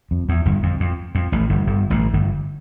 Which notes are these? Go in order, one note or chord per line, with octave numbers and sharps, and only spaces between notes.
F2
E2
G1 G2
F2
F2
F2
A1 A2
G1 G2
G1 G2
A1 A2
G1 G2